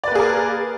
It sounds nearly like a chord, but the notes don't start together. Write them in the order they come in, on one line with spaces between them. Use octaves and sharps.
D5 B4 A#3 G#4 A#4